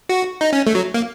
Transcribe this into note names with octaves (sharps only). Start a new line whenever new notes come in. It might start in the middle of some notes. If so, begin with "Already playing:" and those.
F#4
D#4
C#4
A3
F#3
A#3